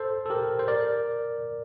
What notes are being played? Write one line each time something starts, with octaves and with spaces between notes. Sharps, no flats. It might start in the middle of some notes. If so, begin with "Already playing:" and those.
Already playing: A4 C5
A4
G4 A#4
C5
A#4 D5